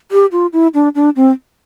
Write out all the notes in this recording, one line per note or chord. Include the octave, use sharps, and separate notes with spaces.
G4
F4
E4
D4
D4
C4